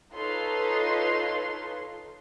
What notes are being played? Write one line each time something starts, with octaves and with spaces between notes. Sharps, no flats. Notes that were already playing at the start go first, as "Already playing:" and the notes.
D#4 F4 A4 B4 C#5 C6